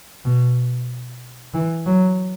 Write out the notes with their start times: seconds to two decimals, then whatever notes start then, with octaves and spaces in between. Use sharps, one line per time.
0.25 B2
1.54 E3
1.86 F#3